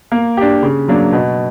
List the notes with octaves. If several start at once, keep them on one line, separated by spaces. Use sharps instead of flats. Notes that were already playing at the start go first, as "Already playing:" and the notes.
A#3
D4 G4
C#3
F#3 A#3 D4
B2